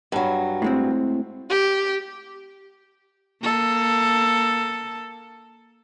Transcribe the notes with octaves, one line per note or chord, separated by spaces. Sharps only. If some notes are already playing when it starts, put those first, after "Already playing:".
G2 F#3
A2 G#3 C4
G4
A#3 A4